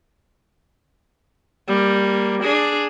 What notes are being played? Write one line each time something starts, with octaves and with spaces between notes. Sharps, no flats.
G3 A#3
D4 G#4